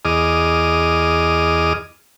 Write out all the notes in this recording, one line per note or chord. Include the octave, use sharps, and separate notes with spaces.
E2 G#4 D#5 D6 D#6 F6